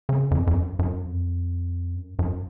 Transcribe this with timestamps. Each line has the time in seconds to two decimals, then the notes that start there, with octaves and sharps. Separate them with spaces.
0.09 C#3
0.31 F2
0.47 F2
0.55 F#2
0.79 F#2
1.02 F2
1.95 F#2
2.19 F#2